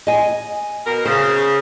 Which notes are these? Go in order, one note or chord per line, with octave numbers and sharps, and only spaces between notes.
D#5 G#5
B2 A#4
C#3 C5